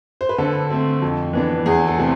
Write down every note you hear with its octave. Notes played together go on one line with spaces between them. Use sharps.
C5
B4
D3 A4
A3 C4
F2
E3 B3 D4
E2 G#4
A4
C3 E3 A3 C4